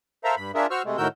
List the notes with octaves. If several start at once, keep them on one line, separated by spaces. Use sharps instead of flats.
A4 A#4 C5 E5 F5 A#5
G2 B5
D4 F4 G#4 A#4 E5
F#4 C5 C#6 E6 F6
C3 G#3 A3
A2 D#3 F#4 A#4 E6 G6